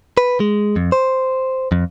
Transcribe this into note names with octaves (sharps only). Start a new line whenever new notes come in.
B4
G#3
F2
C5
F2